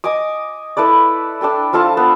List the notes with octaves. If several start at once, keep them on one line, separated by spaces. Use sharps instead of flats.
D#5 G#5 D6 D#6
E4 A4 B4 D5
D4 A4 G5 A5
F3 F4 A4 A5
B3